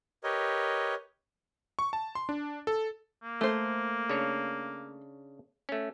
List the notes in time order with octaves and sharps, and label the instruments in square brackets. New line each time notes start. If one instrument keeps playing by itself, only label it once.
[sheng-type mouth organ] G4 A#4 B4 C#5 D#5
[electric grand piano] C#6
A5
C6
D4
A4
[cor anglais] A#3
[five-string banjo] A3 C5
[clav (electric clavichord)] C#3 D4 C#5
A3 C#4